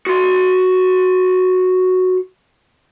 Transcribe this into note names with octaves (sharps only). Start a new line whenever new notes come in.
F#4 C6